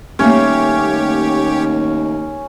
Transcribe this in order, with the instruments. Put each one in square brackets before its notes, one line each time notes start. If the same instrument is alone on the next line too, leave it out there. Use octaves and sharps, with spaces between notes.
[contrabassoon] D#2 [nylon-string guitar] G3 A3 A#3 [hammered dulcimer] C#4 [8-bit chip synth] G4 C#5